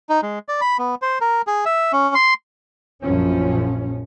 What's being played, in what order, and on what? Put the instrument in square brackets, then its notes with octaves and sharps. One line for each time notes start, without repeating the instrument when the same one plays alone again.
[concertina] D#4
G#3
D5
B5
B3
C5
A#4
G#4
E5
C#4
C6
[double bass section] A#1 F#2 F3 C#4